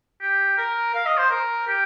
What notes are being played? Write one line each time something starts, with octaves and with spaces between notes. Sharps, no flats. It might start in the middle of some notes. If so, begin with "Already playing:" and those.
G4
A#4
F5
D#5
C5
A#4
G4